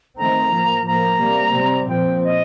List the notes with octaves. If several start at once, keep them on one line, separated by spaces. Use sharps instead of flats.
D#3 A3 C4 A#5
A2 F3 A#3
A2 F3 A#3 A#5
C3 G3 A#3
C3 G3 C4
A#2 F3 C4 G5
D#5